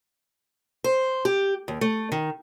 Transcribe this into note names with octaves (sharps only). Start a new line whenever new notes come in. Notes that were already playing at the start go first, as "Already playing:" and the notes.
C5
G4
D#2
A3
D#3